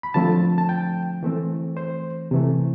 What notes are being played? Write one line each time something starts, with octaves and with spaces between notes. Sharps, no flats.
B5
D3 F3 A3 C4 A5
A5
G5
E3 A3 C4
C5
C3 E3 A3